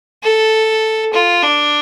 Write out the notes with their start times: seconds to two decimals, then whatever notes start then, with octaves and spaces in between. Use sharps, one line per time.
0.23 A4
1.13 F4
1.43 D4